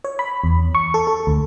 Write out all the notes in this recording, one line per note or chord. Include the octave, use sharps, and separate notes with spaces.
C#5
B5
E2
C#6
A4
A4
D2